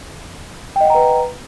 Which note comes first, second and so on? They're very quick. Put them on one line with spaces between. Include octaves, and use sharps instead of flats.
G5 D#5 F#5 A#5 B4